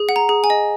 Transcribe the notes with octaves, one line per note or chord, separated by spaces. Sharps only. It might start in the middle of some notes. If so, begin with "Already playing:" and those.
Already playing: G#4
F#5
A#5
G#4
G#5
D#5